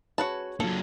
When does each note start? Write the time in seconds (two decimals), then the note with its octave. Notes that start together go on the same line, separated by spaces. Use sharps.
0.18 F#4 G#4 B4 C#5 A5
0.60 F#3 A#3 D4 F4 A4